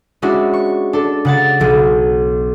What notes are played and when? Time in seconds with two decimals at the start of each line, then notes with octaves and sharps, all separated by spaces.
0.22 G#3 C#4 D4 E4 F#4
0.53 C#6
0.93 D4 A4
1.25 C#3 F#5 A6
1.60 B1 F#3